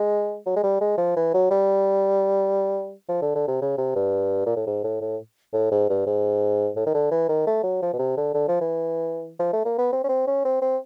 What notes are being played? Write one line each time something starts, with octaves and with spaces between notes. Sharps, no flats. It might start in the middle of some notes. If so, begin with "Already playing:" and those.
Already playing: G#3
F#3
G#3
G3
G#3
F3
E3
F#3
G3
F3
D3
D3
C3
C#3
C3
G2
A#2
A2
G#2
A2
A2
A2
G#2
G2
G#2
A2
D#3
D3
E3
D#3
A3
F#3
F3
B2
C3
D3
D3
F3
E3
F3
A3
A#3
B3
C4
C#4
C4
C#4
C4
C4